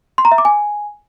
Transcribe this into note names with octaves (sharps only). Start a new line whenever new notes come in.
C6
A#5
E5
D6
G#5